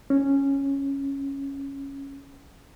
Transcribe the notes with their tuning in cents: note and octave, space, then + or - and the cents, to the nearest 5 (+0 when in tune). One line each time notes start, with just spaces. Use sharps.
C#4 -5